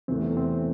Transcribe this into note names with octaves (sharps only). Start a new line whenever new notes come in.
E2 C3 E3 A3 C4
C4